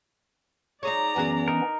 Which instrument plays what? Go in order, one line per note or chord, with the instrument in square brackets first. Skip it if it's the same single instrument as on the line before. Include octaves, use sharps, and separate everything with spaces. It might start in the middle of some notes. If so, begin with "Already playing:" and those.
[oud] D#4 G#4 C#5 [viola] D5 A#5
[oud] F#2 F#4 G#4 [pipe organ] E3 B3 C#4
[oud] D4 [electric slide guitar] D#4 A#4